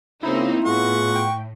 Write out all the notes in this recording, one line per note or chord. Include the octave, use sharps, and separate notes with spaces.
C#2 C#3 A#3 C4 D#4 E4
A2 B3 F4 G#4 F#5 C#6
G5